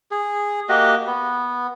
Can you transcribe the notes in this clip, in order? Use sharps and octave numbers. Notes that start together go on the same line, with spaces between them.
G#4
A#3 F#4 G4 D#5
B3